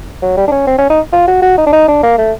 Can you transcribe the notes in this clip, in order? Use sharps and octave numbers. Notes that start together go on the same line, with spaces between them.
F#3
G3
D4
C#4
C4
C#4
D#4
F4
F#4
F#4
D#4
D4
D#4
D4
A#3
A3